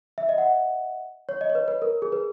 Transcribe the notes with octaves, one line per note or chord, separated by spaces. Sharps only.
E5
D#5
F#5
C#5
D#5
C#5
B4
B4
A#4
G#4
B4